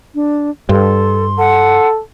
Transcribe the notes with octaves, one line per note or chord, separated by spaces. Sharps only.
D4
G2 A4 C6
A4 F#5